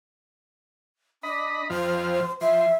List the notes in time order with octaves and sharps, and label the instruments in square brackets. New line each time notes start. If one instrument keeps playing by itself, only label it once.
[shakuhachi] D4 [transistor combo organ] D#5 B5
[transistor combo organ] F2 F3 F6 [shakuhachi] C5
[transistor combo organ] F3 C6 [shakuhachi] E5